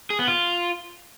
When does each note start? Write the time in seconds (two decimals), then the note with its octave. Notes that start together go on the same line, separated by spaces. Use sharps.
0.10 G#4
0.19 B3
0.28 F4